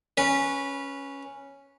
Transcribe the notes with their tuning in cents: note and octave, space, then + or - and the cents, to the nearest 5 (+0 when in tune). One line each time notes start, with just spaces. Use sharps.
C#4 +0 B4 -20